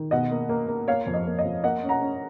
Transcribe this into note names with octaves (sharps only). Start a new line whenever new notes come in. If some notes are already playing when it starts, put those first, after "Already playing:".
Already playing: D#3
B2 D#5 F#5
A#3
A#3
A#3
A#3 C#5 F5
F2
D#5
A#3
D#5
F2
A#3 D#5 F#5
C#4
F#5 A#5
C#4